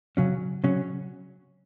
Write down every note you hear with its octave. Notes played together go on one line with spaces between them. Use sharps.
C#3 F#3 C#4
C#3 F#3 C#4